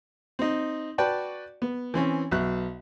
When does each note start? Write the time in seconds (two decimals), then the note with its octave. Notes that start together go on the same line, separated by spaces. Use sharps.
0.39 C4 D#4
0.98 F#4 B4 D5 G5 A5 C#6
1.62 B3
1.94 E3 C4 C#4
2.31 B1 F#4 E5 F#6